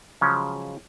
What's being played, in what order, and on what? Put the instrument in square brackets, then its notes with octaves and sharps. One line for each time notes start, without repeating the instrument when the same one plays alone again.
[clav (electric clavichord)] C#3 F3 F#3 G#3 C#4